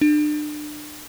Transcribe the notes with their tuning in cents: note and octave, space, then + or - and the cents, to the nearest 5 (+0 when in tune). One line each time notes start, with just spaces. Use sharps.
D4 +35